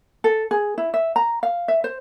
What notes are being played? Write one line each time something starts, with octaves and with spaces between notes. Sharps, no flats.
A4
G#4
E4
E5
A#5
F5
E5
C5